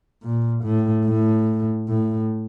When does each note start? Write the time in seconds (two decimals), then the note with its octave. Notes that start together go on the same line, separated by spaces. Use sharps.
0.23 A#2
0.64 A2
1.06 A2
1.89 A2